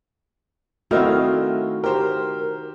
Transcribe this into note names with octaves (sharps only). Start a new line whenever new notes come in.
D#3 A3 C4 E4 F#4 D#5 F5 F6
G4 A#4 C5